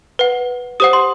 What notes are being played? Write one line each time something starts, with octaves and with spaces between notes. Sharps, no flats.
B4 F#5
G4 C5 F#5 D#6
C6